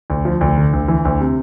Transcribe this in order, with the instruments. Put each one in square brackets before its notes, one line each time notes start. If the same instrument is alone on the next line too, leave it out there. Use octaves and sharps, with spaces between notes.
[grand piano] D2
F3
D2
D3
D2
E3
D2
C3